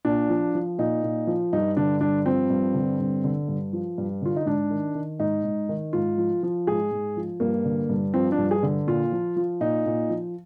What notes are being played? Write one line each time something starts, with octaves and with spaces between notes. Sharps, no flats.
A#2 D4
F3
F3
A#2 D#4
A#2
F3
G2 D#4
D3 D4
G2 D4
F3 C4
G2
D3
G2
D3
G2
F3
G2
D3 F4
D#4
G#2 D4
D#3
D#3
G#2 D#4
G#2
D#3
G#2 F4
F3
F3
G#2 G#4
G#2
F3
G2 A#3
D3
G2
F3 C4
D4
G2
G#4
D3
A#2 F4
F3
F3
A#2 D#4
A#2
F3